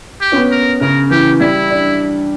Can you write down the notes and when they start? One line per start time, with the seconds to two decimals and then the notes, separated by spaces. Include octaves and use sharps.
0.21 G4
0.32 C#4
0.36 B3
0.51 A#4
0.81 C#3 A#4
1.10 E3 G4
1.40 G3 E4
1.70 D4